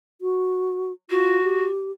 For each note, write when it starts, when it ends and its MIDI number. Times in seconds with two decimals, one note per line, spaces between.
0.21 0.92 66
1.10 1.42 65
1.10 1.66 66
1.43 1.92 67